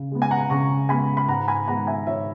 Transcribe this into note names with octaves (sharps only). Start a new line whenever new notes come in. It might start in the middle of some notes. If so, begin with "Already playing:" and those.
Already playing: C#3
G#3 B3
G#5
F#5 A#5
C#3 A#5 C#6
G#3 B3 G#5 B5
B5
G#2 F#5 A#5
G#5 B5
D#3 G#3 B3 F#5 A#5
E5 G#5
G#2 C#5 E5